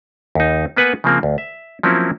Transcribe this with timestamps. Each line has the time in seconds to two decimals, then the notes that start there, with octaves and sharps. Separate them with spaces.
0.35 D#2 D#4
0.77 A#3 B3 B4 F#5 G#5
1.04 C#3 F3 A#3 C4
1.23 D2
1.38 E5
1.83 F3 F#3 A#3 C4 C#4 E4